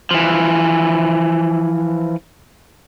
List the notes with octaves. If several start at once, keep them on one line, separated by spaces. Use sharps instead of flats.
E3 F3